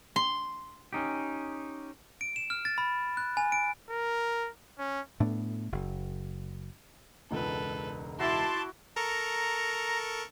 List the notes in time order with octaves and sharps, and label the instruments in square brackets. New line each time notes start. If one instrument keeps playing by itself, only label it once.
[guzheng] C6
[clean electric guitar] C#4 D#4 G4
[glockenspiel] D7
E7
F6
A6
B5
F#6
G#5
D7
[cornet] A#4
C#4
[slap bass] A2 A3 B3 D4
F#1
[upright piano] E1 C#2 G#2 [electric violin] A4 B4
[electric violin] E4 D6 [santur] F#4 E5 [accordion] A5 C6
[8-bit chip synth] A4 A#4 C#6 [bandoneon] A#5